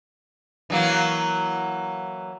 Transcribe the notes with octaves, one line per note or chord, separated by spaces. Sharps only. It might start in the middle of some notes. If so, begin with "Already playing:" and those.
E3 F#3 A#3